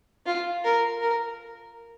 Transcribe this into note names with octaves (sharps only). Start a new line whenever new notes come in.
F4
A#4
A#4